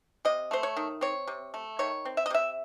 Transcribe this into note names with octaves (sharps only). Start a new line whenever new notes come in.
C3 D#5
A3 C5
C#5
D#3
C4 C#5
C3
A3
D#3 C#5
C4
E5
D#5
C3 E5